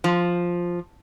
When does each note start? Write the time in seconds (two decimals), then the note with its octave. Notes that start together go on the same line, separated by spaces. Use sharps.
0.04 F3